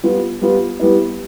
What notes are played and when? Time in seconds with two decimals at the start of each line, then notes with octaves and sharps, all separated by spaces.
0.03 G3 B3 F4
0.41 G3 B3 F4
0.80 G3 B3 E4